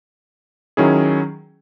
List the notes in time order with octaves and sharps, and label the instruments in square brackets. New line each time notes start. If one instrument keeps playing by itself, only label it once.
[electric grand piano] D#3 F#3 C#4 E4 G#4